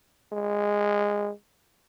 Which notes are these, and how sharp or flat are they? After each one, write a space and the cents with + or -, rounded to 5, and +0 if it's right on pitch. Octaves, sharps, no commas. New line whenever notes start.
G#3 -15